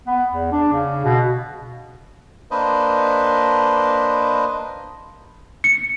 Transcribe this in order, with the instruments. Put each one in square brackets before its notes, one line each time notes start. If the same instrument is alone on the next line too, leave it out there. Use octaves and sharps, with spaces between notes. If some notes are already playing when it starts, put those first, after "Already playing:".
[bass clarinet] B3
E2
D4
C#3
B2
[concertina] A#3 D4 B4 C5 D#5
[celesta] C#7